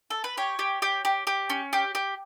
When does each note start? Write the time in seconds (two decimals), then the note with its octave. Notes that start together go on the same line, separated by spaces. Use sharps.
0.10 A4
0.24 B4
0.37 G4 C#5
0.59 G4
0.82 G4
1.05 G4
1.27 G4
1.50 C#4
1.73 G4
1.95 G4